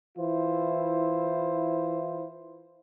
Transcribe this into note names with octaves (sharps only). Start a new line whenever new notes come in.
E3 E4 F4 C5